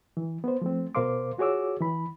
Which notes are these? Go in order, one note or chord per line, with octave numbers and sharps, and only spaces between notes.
E3
B3 C5
F3 A3 C4
B2 A#4 C5 F5 C6 D6
F4 F#4 G#4 C#5 D6 E6
E3 B5